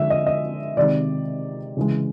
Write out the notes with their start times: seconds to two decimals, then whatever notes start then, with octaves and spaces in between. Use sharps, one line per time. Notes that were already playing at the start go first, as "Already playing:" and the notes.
Already playing: D3 F3 G#3 E5
0.10 D#5
0.26 D#5
0.77 C3 D#3 G#3 D5
1.77 C#3 E3 G#3